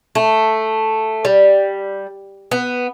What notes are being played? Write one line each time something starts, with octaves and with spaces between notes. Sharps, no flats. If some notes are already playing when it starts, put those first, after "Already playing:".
A3
G3
B3